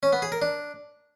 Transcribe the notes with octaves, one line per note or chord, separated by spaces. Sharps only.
C#4
B3
G#4
A#4
D4